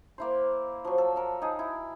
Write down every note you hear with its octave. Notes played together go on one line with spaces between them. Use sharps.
A#3 E4 C5
F3 F#3
A4
A4 A#4
D#4 G#4
E4